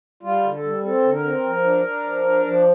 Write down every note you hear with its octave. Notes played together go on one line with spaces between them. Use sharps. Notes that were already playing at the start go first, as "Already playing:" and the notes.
G3 F4
D3
A4
G3
C4 A4
D3
A#4
C4
F3
D4
D4
F3
D4
F3